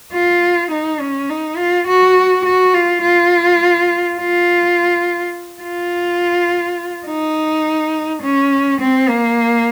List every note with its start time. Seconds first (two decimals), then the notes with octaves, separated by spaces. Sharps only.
0.13 F4
0.71 D#4
1.00 C#4
1.29 D#4
1.57 F4
1.87 F#4
2.45 F#4
2.74 F4
3.02 F4
4.18 F4
5.62 F4
7.07 D#4
8.22 C#4
8.80 C4
9.09 A#3